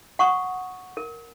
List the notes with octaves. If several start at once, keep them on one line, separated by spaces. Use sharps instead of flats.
F#5 C#6 D#6
A#4